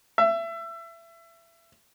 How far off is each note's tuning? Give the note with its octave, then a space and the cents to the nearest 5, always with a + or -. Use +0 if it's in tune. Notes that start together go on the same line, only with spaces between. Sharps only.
E5 +25